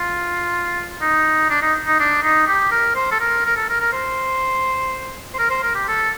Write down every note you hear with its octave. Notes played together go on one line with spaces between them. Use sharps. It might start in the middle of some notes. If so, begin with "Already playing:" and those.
Already playing: F4
D#4
D4
D#4
D#4
D4
D#4
G4
A#4
C5
A4
A#4
A#4
A4
A#4
A#4
C5
C5
A#4
C5
A#4
G4
A4